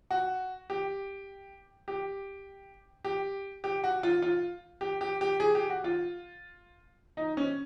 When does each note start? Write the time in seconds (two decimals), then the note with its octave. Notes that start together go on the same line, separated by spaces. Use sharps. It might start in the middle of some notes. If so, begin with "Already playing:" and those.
0.11 F#4
0.70 G4
1.88 G4
3.05 G4
3.64 G4
3.84 F#4
4.03 F4
4.22 F4
4.81 G4
5.01 G4
5.21 G4
5.40 G#4
5.55 G4
5.70 F#4
5.84 F4
7.17 D#4
7.37 C#4